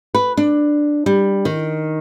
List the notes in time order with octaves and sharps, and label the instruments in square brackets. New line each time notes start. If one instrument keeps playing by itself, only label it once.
[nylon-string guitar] B4
D4
G3
D#3